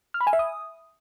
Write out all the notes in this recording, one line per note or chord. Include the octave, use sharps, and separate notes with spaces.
F6
B5
G#5
E5
D#6